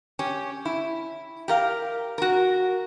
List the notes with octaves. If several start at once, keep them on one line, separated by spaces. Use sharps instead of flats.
C#4 G4
E4
G4 A#4 F5
F#4 A#4